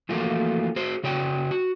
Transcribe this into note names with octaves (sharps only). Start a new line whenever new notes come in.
E3 F3 A3 A#3 F4 F#4
F#4 G#4 C5
C#3 F#4 C#5 D5 G5
F#4